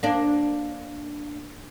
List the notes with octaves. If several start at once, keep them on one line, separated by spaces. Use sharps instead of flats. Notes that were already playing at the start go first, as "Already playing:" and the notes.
A#3 D4